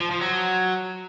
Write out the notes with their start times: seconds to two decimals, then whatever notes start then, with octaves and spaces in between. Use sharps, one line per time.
0.01 F3
0.11 F3
0.21 F#3